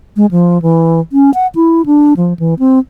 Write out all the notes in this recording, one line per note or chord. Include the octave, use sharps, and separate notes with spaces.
G#3
F3
E3
C#4
F#5
E4
D4
F3
E3
C4